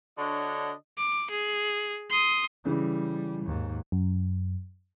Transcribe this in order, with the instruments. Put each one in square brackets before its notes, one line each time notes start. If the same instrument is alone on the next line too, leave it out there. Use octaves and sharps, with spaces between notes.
[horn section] D3 D4 F#4 C#5 D#5
[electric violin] D6
G#4
C6 D#6
[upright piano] C#3 E3 [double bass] G3
[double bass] D#2 G#2
[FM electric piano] F#2